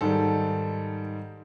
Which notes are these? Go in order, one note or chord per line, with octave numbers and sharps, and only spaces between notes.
G#2 D#3 G3 A4